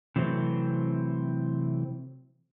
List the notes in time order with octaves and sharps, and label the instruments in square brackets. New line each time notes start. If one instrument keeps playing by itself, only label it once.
[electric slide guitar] C3 E3 F#3 A3 C4